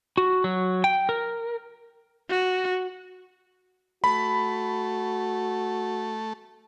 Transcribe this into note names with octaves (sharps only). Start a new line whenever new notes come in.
F#4
F#3
G5
A#4
F#4
A3 F#4 B5